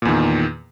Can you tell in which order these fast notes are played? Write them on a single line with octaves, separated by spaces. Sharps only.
A#2 E2 D#3